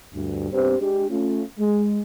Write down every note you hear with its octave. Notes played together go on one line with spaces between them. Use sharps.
D2 G2
G2 B3 C4 G4 C5
G#3 D4 G4
A3 C#4 F4
G#3